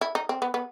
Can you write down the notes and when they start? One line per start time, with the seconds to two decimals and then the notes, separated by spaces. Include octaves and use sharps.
0.01 E4
0.15 D#4
0.29 C4
0.42 B3
0.54 B3